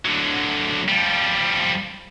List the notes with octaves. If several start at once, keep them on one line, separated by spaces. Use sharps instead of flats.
D3 F#3
F3 G3